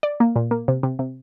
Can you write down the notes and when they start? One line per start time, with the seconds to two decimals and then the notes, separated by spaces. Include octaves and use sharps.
0.03 D5
0.20 A#3
0.36 A#2
0.51 A#3
0.68 C3
0.83 C3
0.99 C3